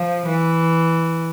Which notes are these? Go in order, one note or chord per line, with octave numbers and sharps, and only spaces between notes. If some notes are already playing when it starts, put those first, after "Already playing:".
Already playing: F3
E3